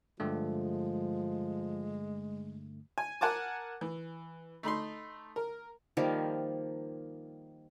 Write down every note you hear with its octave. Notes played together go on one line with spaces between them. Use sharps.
G2 D3 F3 G#3 A3
G#5
A#4 F#5 G#5 A5 D6
E3
A3 D#4 B5 C6
A#4
D#3 F3 G3 A#3